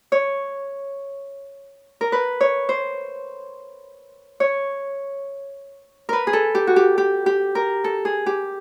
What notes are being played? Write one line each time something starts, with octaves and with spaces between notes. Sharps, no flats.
C#5
A#4
B4
C#5
C5
C#5
A#4 B4
G#4
A4
G4
F#4
G4
G4
G4
A#4
A4
G#4
G4